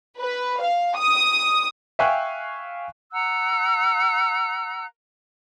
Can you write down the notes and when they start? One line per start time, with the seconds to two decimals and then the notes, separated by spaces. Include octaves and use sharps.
0.18 B4
0.62 F5
0.96 D#6
1.99 E5 F5 G5 G#5 C#6 F#6
3.12 F#5 A#5 E6 F#6